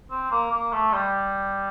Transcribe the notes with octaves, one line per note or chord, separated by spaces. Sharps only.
C4
A#3
A#3
A3
G3